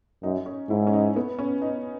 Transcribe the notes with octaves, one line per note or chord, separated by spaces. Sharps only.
F#2 D#4
C#4
G#2 E4
C#4
D#4
B3
C#4
D#4